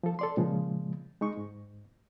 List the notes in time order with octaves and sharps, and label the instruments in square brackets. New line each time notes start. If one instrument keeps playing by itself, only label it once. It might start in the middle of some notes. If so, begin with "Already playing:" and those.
[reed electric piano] F3 A4
A4 D5 C6
A#2 C#3 F3 G#3
G#3 D#4 C#6
G#2